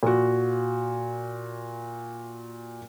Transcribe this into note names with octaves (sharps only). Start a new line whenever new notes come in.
A#2 F#4